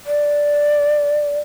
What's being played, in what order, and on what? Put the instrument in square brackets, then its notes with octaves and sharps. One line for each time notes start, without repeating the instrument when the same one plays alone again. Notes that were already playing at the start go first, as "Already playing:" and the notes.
[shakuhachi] D5